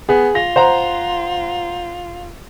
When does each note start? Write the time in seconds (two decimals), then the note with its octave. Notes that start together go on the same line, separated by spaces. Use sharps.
0.09 B3 G#4
0.35 F4 A#6
0.56 C5 F#5 A#5